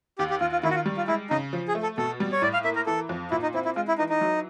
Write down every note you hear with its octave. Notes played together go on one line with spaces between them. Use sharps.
D#2 G4
G4
D#2 F4
F4
D#3 E4
F#4
F4
G3
F4
G#3 E4
C#3 D#4
F3
G#4
A3
A4
B2 A4
G3
C#5
A2 D5
F5
A#3 E5
A#4
E3 A4
F2
A#2 E4
D#4
C4 E4
E4
G#3 F4
E4
E3 D#4
D#4
F#3